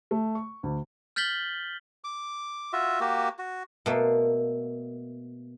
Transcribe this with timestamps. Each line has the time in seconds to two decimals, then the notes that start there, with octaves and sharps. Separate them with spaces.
0.11 A3
0.35 C#6
0.63 D2
1.16 F6 G6 A6 B6 F#7 G7
2.04 D6
2.73 F4 F#4 E5
3.01 A#3 F#4 G4
3.39 F#4
3.86 B2 A3 A#3